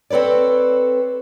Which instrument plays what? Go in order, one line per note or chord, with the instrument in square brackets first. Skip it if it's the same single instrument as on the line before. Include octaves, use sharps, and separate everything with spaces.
[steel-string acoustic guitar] C4 A4 B4 C#5 D5